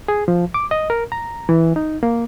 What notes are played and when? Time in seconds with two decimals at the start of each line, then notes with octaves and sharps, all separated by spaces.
0.08 G#4
0.28 F3
0.54 D6
0.71 D#5
0.90 A#4
1.12 A#5
1.49 E3
1.76 D#4
2.03 A#3